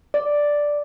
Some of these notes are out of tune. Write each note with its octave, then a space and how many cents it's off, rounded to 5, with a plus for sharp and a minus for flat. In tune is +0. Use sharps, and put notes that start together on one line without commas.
D5 +0